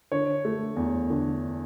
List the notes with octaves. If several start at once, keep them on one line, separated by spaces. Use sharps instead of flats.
D3 C#5
A3
E2
D3